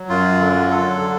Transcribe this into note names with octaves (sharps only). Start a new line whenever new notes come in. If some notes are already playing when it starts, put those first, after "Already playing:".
Already playing: F#3
F#2 F4
D3
F#3 A4
D3